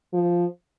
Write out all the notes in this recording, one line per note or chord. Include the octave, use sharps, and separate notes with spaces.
F3